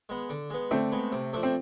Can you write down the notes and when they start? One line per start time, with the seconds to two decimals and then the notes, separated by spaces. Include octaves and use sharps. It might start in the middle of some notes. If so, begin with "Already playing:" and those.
0.09 G#3 B3
0.29 D3
0.50 G#3 B3
0.71 D3 A3 C4
0.92 G#3 B3
1.12 C3
1.33 F3 A3 D4 A4
1.43 C4